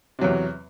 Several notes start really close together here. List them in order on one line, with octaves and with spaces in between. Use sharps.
C3 F#3 E2